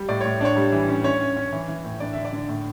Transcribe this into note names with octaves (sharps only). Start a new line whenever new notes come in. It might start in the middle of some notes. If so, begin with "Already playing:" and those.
Already playing: G3
A2 D5
A2 C#5
D4 C#5
G3
E3
C#4
C#4 C#5
C#4
C#4
E3
E3
A2
D4 D5
D3 E5
D5
D3
A2